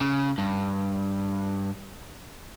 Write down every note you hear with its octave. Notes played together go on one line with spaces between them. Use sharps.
C#3
G2